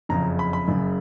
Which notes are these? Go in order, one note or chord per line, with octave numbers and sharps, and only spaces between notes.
F#1 F2 C#3 A#5
B5
B5
F#1 F#2 C#3